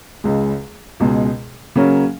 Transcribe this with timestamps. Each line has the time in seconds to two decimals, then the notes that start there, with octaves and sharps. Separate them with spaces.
0.24 C#2 C#3 G#3
1.00 C#2 B2 G#3
1.76 C#3 F#3 A#3 C#4